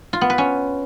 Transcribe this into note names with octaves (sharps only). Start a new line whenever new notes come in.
F4
B3
B4
C#4